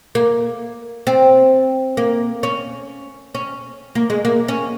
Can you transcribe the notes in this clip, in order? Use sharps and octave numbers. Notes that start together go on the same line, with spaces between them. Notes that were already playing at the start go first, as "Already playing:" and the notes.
A#3
C4
A#3
C#4
C#4
A#3
G#3
A#3
C#4